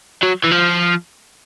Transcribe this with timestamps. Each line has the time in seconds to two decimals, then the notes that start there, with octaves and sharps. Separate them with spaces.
0.23 F#3
0.44 E3
0.51 F3